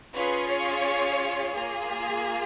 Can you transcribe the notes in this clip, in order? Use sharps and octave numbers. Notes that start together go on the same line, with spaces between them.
C#4 F4 G#4 B4
C#5
A#3 F4 G#4